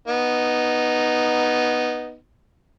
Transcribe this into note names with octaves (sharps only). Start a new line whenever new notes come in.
B3 D#4